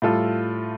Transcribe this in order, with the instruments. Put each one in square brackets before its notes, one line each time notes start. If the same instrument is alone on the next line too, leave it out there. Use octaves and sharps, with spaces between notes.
[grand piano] A2 G3 F4 A4